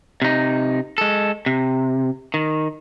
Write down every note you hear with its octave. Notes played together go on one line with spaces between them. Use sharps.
C3 D#4
G#3 A4
C3
D#3